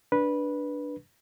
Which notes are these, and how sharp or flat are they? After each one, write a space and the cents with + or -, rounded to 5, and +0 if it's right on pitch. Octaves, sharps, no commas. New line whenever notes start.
D4 +0 B4 -10